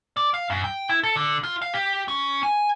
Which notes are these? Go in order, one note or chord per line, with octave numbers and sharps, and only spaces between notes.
D5
F5
F#2
G5
E4
A4
D3
F4
F5
G4
C#4
G#5